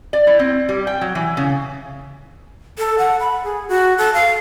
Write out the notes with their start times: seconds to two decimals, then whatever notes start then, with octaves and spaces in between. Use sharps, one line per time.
0.13 D5
0.27 E4
0.39 C4
0.69 G3
0.87 G5
1.01 F#3
1.15 E3
1.37 C#3
2.78 A4
2.98 F#5
3.20 B5
3.44 G#4
3.68 F#4
3.98 A4
4.14 F5